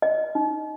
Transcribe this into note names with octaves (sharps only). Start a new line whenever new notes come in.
D#5
D#4